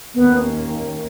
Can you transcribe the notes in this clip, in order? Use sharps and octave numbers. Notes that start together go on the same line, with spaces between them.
D#2 D#3 A#3 B3 C#4